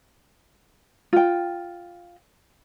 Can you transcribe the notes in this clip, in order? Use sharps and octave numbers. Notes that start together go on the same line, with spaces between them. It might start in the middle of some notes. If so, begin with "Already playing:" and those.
F4 G5